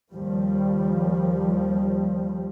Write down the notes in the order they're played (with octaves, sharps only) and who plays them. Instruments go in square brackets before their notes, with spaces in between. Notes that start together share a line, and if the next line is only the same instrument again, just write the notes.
[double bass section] D#2 F3 G3